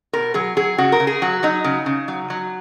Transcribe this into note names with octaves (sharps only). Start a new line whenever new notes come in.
B2 A#4
F#3 G#4
F#3 G#4
C#3 F#4
A#4
C#3
G#4
F#3 F#4
F#3 D#4
C#3
C#3
F#3
F#3